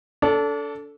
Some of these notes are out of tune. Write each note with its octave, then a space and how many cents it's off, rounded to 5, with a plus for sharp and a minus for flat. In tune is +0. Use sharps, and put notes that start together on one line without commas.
D4 -30 A4 +0